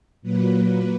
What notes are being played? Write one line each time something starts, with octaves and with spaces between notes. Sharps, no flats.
A#2 F#3 A#3 B4